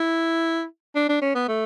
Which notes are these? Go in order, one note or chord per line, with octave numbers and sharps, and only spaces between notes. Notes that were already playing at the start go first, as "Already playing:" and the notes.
Already playing: E4
D4
D4
C#4
B3
A3